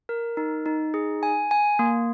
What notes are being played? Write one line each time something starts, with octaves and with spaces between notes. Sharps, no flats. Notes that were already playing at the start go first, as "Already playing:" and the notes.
A#4
D#4
D#4
G#4
G#5
G#5
A#3